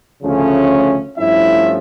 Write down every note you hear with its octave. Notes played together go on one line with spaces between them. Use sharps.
D2 C#3 F3 A3 C#4
G2 F3 A3 C#4 E4 E5